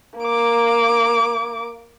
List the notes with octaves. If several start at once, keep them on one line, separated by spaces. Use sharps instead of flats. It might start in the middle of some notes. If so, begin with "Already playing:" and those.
A#3 D6